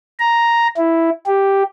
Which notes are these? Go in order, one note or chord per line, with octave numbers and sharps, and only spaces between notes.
A#5
E4
G4